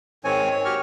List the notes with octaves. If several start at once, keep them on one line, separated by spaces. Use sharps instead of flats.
G#2 D#3 C4 C#5 G#5
C#5
F#4 G4 C#6 F6